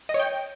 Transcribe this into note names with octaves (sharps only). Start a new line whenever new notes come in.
D#5
C#5
G5